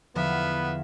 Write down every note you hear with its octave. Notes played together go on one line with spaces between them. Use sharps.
E2 D3 F3 B3 E5 F5